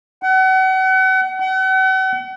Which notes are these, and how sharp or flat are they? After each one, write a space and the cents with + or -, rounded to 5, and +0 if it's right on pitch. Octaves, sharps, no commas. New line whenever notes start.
F#5 +35
F#5 +40